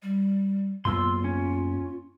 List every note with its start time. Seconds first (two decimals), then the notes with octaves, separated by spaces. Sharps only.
0.03 G3
0.85 F#2 A#3 B3 F4 C6 E6
1.24 C#4